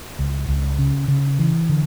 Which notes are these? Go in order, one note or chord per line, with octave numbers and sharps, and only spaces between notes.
C#2
C#2
C#3
C#3
E3
D3